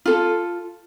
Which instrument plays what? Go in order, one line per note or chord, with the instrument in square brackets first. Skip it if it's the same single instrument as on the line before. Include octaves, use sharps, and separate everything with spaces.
[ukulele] F4 A4